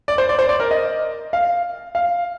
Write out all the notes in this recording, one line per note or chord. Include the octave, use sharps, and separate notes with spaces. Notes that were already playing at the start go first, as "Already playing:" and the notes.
D5
C5
D5
C5
D5
A#4
D#5
F5
F5